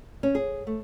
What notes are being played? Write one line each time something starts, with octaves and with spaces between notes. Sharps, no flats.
C#4
G#4
A3